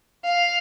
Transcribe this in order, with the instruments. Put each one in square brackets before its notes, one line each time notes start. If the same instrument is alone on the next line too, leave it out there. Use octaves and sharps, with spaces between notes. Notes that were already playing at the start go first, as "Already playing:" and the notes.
[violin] F5